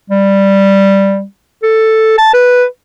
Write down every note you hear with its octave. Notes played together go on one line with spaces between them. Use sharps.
G3
A4
A5
B4